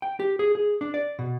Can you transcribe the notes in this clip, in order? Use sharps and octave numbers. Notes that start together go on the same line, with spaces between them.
G5
G4
G#4
G#4
D4
D5
B2